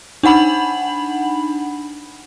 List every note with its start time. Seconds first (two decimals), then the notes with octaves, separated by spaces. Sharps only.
0.23 D4 D#4 F#5 B5 F#7